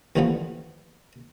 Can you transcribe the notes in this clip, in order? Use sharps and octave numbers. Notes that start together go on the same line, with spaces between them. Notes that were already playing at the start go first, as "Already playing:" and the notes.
D#2 D3 E3 F3 A3 B3